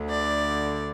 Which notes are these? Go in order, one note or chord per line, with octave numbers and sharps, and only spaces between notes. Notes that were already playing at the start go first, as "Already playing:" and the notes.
Already playing: D2 D3
D5